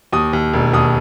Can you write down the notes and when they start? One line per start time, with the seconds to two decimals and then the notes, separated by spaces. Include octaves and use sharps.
0.13 D#2 D#6
0.33 D#2
0.53 E1
0.73 D#2 D#6